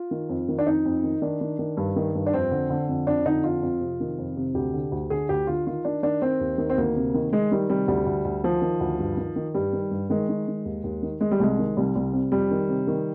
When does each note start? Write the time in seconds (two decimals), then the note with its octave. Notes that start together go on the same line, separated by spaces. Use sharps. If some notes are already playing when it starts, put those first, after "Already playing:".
Already playing: F4
0.11 D#3
0.29 F2
0.48 D#3
0.59 D4
0.67 F2 D#4
0.85 F2
1.04 D#3
1.22 D#3 D4
1.41 D#3
1.59 D#3
1.77 G2
1.96 D#3
2.15 G2
2.26 D4
2.33 F2 C4
2.51 D3
2.70 D3
2.88 F2
3.07 F2 D4
3.26 D3 D#4
3.44 F2 F4
3.62 F2
3.81 C3
4.00 D#3
4.19 F2
4.36 C3
4.55 D2 G4
4.74 D3
4.92 D2
5.10 D3 G#4
5.29 D2 G4
5.47 D3 F4
5.67 D#3 F4
5.85 D#3 D4
6.03 D#3 D4
6.22 D#3 C4
6.40 D#2
6.58 D#3
6.70 C4
6.78 D2 A#3
6.95 C3
7.14 D#3
7.32 D#3 G#3
7.52 D#3 G3
7.69 C3 G3
7.88 D2 G3
8.06 D2
8.25 D2
8.44 D#3 F3
8.62 D#3
8.80 D2
8.99 G2
9.17 D#3
9.36 D#3
9.54 G2 G3
9.73 D#3
9.91 G2
10.10 D#3 G#3
10.29 D#3
10.48 D#3
10.65 D#2
10.84 D#2
11.03 D#3
11.21 D#3 G#3
11.31 G3
11.40 C2 G#3
11.58 D#3
11.77 C2 G3
11.96 C2
12.13 C3
12.32 F2 G3
12.51 D#3
12.69 C3
12.87 D#3